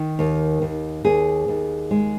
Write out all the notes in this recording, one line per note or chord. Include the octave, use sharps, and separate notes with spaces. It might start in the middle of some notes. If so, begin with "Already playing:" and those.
Already playing: D#3
D#2
D#2
D#2 G#4
D#2
G#3